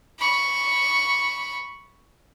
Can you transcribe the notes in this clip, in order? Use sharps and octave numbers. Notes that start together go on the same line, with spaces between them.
B5 C#6